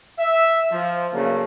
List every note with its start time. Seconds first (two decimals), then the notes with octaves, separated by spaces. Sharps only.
0.19 E5
0.72 F3
1.13 C#3 F#3 A3 A#3 D4